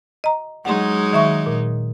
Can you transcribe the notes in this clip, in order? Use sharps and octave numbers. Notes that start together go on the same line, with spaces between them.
D#5 A#5
F#3 G#3 D#4 F#5 C6
D#3 E5 C#6
A#2